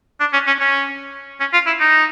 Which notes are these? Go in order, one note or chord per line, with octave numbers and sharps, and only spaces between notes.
D4
C#4
C#4
C#4
C#4
F4
E4
D#4